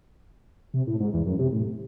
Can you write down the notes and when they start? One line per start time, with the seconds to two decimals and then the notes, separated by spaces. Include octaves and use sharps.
0.74 C3
0.87 A2
1.00 G#2
1.13 E2
1.26 F#2
1.39 C3
1.53 A2